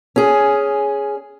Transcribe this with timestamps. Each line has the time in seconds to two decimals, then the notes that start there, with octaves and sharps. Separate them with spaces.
0.16 C#4 G#4